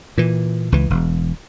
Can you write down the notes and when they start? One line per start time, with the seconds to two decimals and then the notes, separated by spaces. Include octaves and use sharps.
0.18 A#2 E3
0.72 C#2 E3
0.90 E1